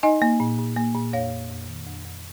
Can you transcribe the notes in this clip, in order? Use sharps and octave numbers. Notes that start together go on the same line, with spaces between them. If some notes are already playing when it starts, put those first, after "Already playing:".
D#4 D#5 G#5
A#3
A#2
A#2
A#3
A#2
F2 C#5 F5
F2
F2
D#3
F2
F2